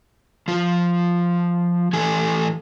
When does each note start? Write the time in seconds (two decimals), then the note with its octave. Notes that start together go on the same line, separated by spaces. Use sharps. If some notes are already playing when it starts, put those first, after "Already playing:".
0.48 F3 F4
1.93 E3 A3 G4 G#5